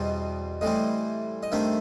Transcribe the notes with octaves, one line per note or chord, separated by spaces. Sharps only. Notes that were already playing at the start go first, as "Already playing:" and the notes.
Already playing: E2 B2 G3 C4 D#5
A2 E3 G3 C4 D#5
D#5
G2 D#3 A3 C4 E5